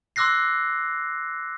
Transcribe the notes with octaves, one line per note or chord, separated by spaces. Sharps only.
C6 D6 E6 F#6 A#6 C7